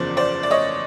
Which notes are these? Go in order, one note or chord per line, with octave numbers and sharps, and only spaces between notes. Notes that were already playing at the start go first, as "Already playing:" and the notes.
Already playing: F#1 E2 C#3 F3 C5 D5
C5 D5
D5
C#5 D#5